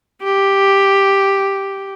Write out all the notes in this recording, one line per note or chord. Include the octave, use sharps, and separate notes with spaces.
G4